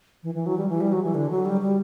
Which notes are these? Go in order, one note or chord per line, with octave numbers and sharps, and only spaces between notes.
E3
E3
F#3
G3
E3
G3
F#3
E3
D3
F#3
G3
G3